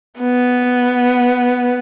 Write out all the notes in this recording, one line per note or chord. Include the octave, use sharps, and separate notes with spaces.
B3